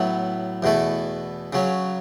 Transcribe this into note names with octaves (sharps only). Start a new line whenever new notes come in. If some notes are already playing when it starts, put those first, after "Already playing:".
Already playing: A2 F#3 B3 E4 A4
E2 B2 A3 E4 A4
C#3 F#3 C#4